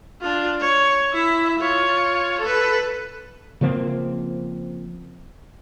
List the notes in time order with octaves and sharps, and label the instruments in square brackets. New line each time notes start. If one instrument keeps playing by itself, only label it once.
[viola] D4 F4
C#5
E4 E5
F4 C#5
A4 B4
[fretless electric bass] C#3 F3 A#3 C4